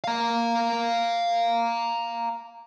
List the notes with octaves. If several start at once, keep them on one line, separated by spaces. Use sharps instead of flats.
F5 A#5